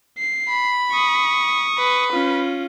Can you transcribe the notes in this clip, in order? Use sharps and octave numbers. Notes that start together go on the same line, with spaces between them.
C7
B5
C#6 D#6
B4
C#4 F4